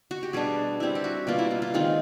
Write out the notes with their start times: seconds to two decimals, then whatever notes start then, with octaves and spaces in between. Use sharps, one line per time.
0.11 F#4
0.23 G4
0.33 B2 G3 B3 D4 G#4
0.80 G3 C4 E4
0.95 G4
1.04 F#4
1.27 B2 G3 A#3 F4
1.39 E4
1.51 F4
1.62 F4
1.74 D#3 G#3 C4 D#4 F4